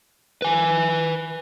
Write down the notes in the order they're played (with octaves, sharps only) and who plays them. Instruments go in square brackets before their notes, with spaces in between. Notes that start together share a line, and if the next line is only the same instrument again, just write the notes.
[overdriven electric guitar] B4 G#5